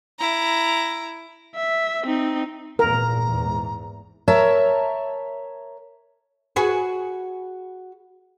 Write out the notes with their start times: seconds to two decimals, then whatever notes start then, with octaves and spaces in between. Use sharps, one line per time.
0.19 E4 A#5
1.55 E5
2.03 C4 D#4
2.79 G#1 E2 A#2 A#4 A#5
3.26 E2 G#2
4.28 A#4 C#5 E5 A5 A#5
6.56 F#4 G#4 B4